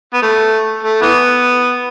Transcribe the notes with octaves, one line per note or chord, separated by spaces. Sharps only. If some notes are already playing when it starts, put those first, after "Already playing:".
B3
A3
A3
E3 B3